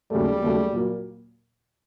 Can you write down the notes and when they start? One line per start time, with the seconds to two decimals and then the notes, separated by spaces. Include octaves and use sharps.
0.11 D#2 C#3 F#3 G3 A3
0.42 D#2 C#3 F#3 A3
0.73 A#2 F#3 A#3